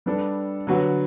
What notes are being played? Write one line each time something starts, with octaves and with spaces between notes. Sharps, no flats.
G3 B3 D4 A4
D3 F#3 B3 F#4